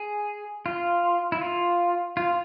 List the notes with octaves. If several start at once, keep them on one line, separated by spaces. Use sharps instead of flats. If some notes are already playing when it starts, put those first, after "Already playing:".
Already playing: G#4
F4
E4
F4
F4